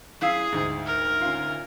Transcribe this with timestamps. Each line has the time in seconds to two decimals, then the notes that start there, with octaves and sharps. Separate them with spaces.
0.21 F#2 E4 G#4 F5
0.52 D2 G#2 G#3
0.86 A#4
1.21 C#4 F4